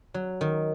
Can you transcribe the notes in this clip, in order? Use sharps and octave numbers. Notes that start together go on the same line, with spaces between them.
F#3
D#3